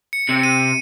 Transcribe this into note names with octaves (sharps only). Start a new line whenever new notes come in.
C#7
C3
D#7